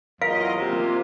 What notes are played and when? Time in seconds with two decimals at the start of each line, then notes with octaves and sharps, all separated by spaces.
0.22 E2 F#3 F4 A#4 D#5 F5
0.57 C3 A#3 F4